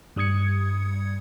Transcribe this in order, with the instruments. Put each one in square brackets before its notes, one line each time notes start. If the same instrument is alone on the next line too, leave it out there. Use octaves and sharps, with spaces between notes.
[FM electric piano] G2 G3 D#6 G#6 C#7